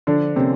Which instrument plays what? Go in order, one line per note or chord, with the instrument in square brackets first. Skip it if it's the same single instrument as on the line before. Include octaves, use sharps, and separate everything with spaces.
[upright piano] D3 D4 [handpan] F3
[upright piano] C3 C4 [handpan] A#3 C#4